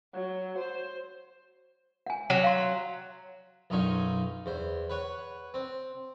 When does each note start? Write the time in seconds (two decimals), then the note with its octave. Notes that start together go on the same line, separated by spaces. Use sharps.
0.14 F#3
0.58 C5
2.06 F#5 G#5
2.30 F#3
2.44 F5 C6
3.70 B1 F#2 C#4 D#4 F4 G#5
4.46 E2 C5
4.90 B4 C#5 F#5
5.54 C4